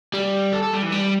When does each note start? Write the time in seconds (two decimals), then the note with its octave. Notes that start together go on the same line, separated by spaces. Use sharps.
0.14 G3
0.52 A4
0.62 A4
0.73 G3
0.82 E3
0.92 G3